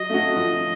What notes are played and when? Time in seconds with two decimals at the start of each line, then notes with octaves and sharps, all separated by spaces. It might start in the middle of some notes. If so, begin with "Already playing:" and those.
Already playing: F#3 D#5
0.10 A3 C#4 F#4
0.36 F3